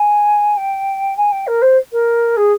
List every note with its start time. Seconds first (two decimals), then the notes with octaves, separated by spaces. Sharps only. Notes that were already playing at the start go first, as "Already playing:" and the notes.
Already playing: G#5
0.57 G5
1.17 G#5
1.32 G5
1.47 A#4
1.62 C5
1.92 A#4
2.37 G#4